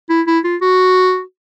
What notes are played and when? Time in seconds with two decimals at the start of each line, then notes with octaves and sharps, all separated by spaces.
0.09 E4
0.27 E4
0.44 F4
0.61 F#4